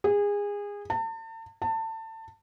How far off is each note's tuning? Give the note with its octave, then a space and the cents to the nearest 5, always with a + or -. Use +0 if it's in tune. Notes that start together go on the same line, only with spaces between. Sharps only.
G#4 -25
A5 +40
A5 +25